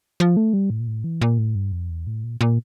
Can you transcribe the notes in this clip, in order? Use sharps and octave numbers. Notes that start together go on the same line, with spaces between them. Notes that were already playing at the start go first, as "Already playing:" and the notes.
F3
A3
G3
A2
A#2
A2
E3
A#2
A2
G2
F2
E2
A2
A#2
A#2